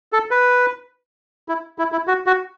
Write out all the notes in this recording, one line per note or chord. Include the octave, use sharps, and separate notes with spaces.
A4
B4
E4
E4
E4
F#4
F#4